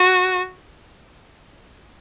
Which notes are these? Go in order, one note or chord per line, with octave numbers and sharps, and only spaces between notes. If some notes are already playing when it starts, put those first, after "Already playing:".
Already playing: F#4